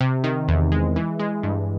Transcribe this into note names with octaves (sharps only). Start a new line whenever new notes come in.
C3
D#3
E2
G#3
E3
G#3
G2